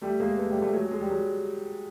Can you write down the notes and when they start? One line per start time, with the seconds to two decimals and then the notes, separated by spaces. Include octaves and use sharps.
0.02 G3 A3
0.20 G#3 A#3
0.37 A3 B3
0.49 G3 A3
0.61 G3 A3
0.73 F#3 G#3
0.91 G#3
1.01 G3
1.10 F#3 G#3